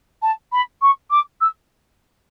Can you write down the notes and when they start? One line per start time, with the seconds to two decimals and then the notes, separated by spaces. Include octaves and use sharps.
0.22 A5
0.52 B5
0.82 C#6
1.11 D6
1.41 E6